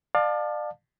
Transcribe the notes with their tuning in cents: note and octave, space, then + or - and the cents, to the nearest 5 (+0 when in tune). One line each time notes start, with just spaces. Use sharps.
D5 +35 F5 +20 A5 +0